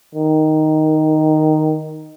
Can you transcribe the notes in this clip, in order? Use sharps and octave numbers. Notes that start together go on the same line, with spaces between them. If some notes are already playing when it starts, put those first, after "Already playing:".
D#3